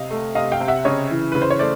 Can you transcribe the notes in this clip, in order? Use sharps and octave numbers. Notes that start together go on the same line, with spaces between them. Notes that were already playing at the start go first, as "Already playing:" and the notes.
Already playing: C3 D#5 F5
A3
C3 D#5 F5
F5 G5
C3
E5 F#5
C#3 C#5 D#5
E3
C#3 B4
C5
C#5
A3 C5 D5